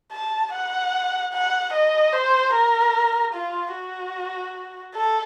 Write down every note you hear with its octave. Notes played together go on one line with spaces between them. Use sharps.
A5
F#5
F#5
D#5
C5
A#4
F4
F#4
A4